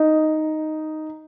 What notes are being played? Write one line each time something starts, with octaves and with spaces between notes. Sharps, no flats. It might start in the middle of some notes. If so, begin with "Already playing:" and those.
Already playing: D#4